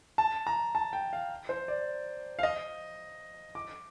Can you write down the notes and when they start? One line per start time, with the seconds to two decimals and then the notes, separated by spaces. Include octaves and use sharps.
0.18 A5
0.47 A#5
0.75 A5
0.93 G5
1.13 F5
1.49 C5
1.68 D5
2.39 F5
2.43 D#5
3.55 D6